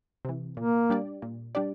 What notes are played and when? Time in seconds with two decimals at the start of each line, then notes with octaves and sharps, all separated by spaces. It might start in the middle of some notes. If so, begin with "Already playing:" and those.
0.25 C3 E3
0.57 A#2 A#3
0.90 G3 D4 G4 D5
1.22 A#2
1.55 G3 D4 G4 D5